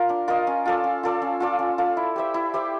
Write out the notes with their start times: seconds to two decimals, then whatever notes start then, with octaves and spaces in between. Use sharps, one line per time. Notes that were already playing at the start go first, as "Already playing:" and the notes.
Already playing: F4 A#4
0.09 D4
0.28 F4 A#4 D#5
0.47 C#4
0.65 F4 A4 D5
0.84 C#4
1.03 F4 A4 D5
1.22 C#4
1.40 F4 A4 D5
1.59 C#4
1.78 F4 A4 D5
1.97 E4
2.16 G4 C5 E5
2.34 E4
2.54 G4 C5 E5